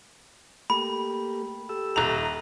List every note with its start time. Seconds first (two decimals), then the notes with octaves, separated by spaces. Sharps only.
0.70 A3 A#3 G4 B5
1.69 G4 A4 E6
1.96 D#1 A#5 F7